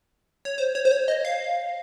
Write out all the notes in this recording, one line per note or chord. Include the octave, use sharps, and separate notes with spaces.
C#5
C5
C#5
C5
C#5
D#5
F5